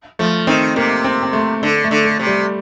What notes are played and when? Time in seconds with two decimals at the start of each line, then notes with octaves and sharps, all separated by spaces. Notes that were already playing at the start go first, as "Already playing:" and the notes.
0.19 F3 A3
0.47 D#3 C4
0.76 C3 A#3
1.04 C4
1.23 C4
1.33 A3
1.62 D3 A3
1.84 A3
1.91 D3
2.05 A3
2.19 C3
2.27 G3